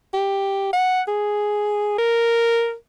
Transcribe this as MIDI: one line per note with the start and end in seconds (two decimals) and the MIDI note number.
0.13 0.69 67
0.73 1.01 78
1.08 1.94 68
1.98 2.74 70